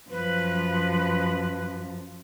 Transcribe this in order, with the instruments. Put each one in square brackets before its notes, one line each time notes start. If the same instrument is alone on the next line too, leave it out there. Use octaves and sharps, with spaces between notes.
[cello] F#2 F3 [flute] B4